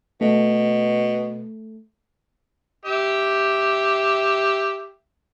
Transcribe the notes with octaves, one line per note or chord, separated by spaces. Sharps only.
B2 A3
G4 E5